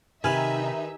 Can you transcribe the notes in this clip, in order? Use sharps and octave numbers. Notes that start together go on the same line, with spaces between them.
C3 D#3 D#4 G#4 B4 E5 G#5 F6